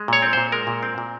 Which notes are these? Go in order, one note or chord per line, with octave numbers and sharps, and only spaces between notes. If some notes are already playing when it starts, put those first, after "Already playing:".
Already playing: G#3
A#2 C#5
C4
A#2 C5
G#3 A#4
A#2
C4
A#2